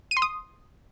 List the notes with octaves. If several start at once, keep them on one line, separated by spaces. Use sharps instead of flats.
D#7
C6
D#6